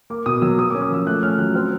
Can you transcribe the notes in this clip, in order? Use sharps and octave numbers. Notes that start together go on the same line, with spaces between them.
A#3 D6
B2 D#6
F#3 E6
A#3 D#6
C#4 D6
D#6
F3 E6
A3 F#6
C#4 F6
F#3 F#6
C4 F6